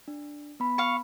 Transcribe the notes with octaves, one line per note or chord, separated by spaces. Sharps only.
D4
B3 B5
F5 C#6